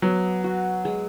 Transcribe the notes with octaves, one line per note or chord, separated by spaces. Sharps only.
F#3 B3
F#4
G#3